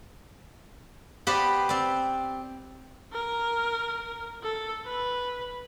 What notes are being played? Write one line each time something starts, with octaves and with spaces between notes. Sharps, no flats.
B3 G4 B4 C5 D5
C4 D5
A#4
A4
B4